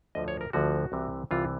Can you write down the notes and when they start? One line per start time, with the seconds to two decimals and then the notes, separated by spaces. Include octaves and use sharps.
0.15 D2 D3 F3 D#5
0.28 C#5
0.41 A#4
0.53 D2 D3 F3 F#4
0.92 C2 C3 E3
1.31 C2 C3 E3 F4